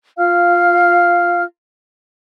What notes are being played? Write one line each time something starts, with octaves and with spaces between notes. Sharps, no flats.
F4 F5 F6